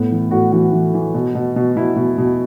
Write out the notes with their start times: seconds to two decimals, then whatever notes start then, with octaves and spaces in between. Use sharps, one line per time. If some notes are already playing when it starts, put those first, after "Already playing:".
Already playing: A2 B3
0.11 E3
0.31 A2 F#4
0.52 E3 F#4
0.72 E3
0.94 E3
1.14 B2
1.35 B2
1.56 B2
1.76 B2 E4
1.96 B2
2.18 B2